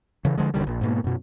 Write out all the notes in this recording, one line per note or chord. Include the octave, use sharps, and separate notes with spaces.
C#3 E3
D3 F3 G#3
D#1 D3 D#3 G3
A#1
G#2 B2 A#3
F#2 B2